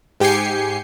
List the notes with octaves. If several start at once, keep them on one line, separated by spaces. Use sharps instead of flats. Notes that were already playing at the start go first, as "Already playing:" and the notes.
G#2 G4 G5 G#5 C7 C#7